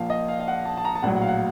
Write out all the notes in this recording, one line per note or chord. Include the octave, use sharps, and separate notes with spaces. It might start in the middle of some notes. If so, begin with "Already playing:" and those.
Already playing: A#1 A#2 F3 F5 A5
D#5
F5
F5
F#5
A5
A5
A#5
A5
A#1 A2 F#3 F#5
F#5
F5
F#5